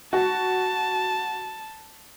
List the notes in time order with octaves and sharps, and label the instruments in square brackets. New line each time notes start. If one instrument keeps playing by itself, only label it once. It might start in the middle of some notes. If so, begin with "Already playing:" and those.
[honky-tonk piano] F#4 [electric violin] A5